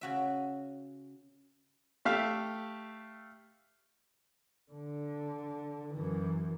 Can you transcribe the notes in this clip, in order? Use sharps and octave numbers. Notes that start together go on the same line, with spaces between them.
C#3 F#4 E5
A3 G4 E5 F5
D3
F#2 E3